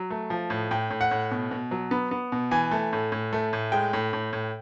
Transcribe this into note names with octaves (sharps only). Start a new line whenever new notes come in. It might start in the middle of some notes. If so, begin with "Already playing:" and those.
Already playing: F#3
A3
F3
A2
A2 G5
A2
F#5
A2
B2
B2
F#3
B3
B3
B2
E3 G#5
A3
A2
A2
A3
A2
G#3 G5
A2
A2
A2